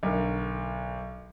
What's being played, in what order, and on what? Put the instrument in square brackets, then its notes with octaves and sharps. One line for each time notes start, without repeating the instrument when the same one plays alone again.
[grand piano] B1 D3 A#4